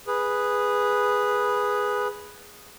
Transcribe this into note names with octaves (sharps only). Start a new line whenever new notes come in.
G#4 B4